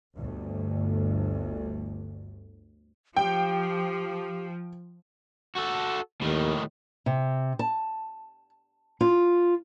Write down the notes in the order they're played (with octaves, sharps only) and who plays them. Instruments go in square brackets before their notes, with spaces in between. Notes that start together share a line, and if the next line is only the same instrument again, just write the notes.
[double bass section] G1 D2
[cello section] F3 [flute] G4 [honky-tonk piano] G5
[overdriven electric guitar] F#4 A4
[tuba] D#2 [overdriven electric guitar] A2 D#3
[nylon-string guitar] C3
A5
F4